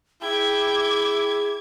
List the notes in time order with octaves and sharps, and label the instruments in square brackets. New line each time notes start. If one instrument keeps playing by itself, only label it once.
[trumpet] E4 [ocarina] G#4 [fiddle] G5 [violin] D6 G#6